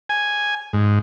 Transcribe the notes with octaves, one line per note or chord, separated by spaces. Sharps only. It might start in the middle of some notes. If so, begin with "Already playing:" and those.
G#5
G#2